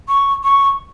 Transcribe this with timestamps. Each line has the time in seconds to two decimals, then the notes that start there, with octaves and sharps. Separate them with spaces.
0.08 C#6
0.44 C#6